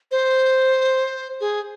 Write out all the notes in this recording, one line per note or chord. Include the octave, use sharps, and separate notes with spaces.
C5
G#4